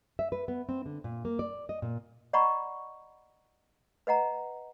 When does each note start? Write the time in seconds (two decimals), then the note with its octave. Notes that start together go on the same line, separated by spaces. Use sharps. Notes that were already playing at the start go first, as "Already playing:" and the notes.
0.19 E5
0.32 B4
0.48 B3
0.69 C4
0.86 D3
1.04 A#2
1.25 A#3
1.39 D5
1.69 D#5
1.82 A#2
2.33 D5 D#5 F#5 A#5 B5 C#6
4.07 B4 D#5 F#5 A#5